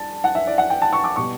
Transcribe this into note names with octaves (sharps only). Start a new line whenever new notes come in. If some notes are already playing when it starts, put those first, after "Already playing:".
Already playing: G2 A5
F#5
E5
D5
F#5
G5
A5
C#6
D6
B2 G3 B3 C#6